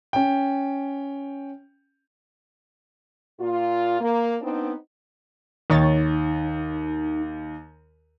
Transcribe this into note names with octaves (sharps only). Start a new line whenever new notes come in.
C#4 G5
A#2 F4
A#3
B3 C4 D4 D#4
D#2 D#3 D#4 C#5 A6